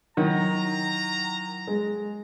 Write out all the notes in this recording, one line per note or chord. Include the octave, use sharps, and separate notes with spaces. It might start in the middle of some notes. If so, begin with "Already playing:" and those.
D#3 F#3 E4 F#5 A#5
G#3